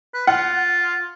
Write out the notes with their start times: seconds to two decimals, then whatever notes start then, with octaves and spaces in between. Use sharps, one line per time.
0.14 B4
0.27 F4 F#5